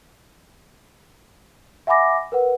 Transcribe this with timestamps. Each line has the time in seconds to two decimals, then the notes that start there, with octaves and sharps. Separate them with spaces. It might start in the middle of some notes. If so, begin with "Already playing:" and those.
1.87 E5 F#5 G#5 B5 D6 A#6
2.32 A#4 B4 F#5